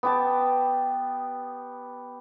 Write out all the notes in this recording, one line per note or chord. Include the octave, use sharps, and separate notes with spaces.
B3 G4 A5